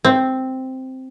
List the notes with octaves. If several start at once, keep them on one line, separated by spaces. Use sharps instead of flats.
C4